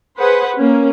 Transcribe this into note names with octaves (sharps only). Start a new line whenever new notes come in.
G#4 B4 C5 F#5
A#3 C#4